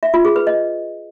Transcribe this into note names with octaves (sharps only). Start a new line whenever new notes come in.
E5
F4
G#4
B4
D#5